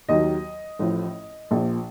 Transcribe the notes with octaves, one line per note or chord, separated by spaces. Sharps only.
D#2 D#3 F#3 D#5
A1 A2 F3
A#1 A#2 F3